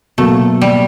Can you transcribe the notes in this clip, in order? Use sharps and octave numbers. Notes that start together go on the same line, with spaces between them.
B2 F#3 A3 A#3
G3